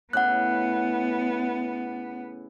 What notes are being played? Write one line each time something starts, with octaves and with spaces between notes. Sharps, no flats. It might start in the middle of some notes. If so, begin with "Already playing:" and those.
A2 C#3 B3 F#5 F#6